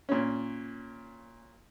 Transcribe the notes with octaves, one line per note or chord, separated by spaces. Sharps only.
A#2 C#4